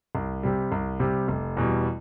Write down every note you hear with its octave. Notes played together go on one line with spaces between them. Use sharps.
C2
C3 G3
C2
C3 G3
F1
E2 B2 G3